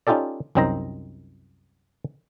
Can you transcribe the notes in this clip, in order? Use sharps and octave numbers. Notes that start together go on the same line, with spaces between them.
C#4 D#4 F4 G4 A4 D5
C2 F#2 C4 D#4 C5 A#5